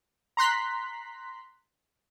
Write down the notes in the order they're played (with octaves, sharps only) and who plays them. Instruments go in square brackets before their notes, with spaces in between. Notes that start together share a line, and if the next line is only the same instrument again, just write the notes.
[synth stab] A#5 C6 F#6 B6